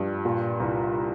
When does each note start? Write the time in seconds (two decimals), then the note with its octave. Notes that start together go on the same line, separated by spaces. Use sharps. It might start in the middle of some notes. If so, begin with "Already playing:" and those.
Already playing: G2 F3
0.25 A#2
0.60 C2